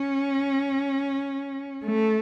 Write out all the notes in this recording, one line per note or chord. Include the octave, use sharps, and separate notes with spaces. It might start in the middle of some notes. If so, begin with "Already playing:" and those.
Already playing: C#4
A3